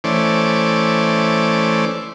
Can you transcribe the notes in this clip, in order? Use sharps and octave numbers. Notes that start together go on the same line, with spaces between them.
E3 A3 C#4 C5 D5